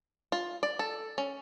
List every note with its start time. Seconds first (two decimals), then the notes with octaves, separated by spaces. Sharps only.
0.32 F4
0.63 D5
0.79 A4
1.18 C#4